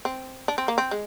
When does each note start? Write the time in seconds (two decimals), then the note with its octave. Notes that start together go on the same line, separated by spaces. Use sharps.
0.05 C4
0.48 D4
0.58 C4
0.68 A#3
0.78 C4
0.91 G#3